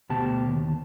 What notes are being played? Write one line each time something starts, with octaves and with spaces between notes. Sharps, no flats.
D2 B2 G4 A5
D#2